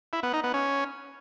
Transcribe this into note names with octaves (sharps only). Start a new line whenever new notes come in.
E4
B3
D#4
B3
C#4